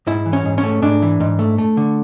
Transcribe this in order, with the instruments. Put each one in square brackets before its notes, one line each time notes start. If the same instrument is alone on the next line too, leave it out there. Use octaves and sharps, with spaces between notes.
[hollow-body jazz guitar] G#2 E4
E3
C#4
G#2
C#4
A3
G#2 D4
E3
G#2
A3
A3
D3